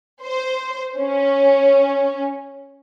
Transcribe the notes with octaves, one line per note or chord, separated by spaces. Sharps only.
C5
C#4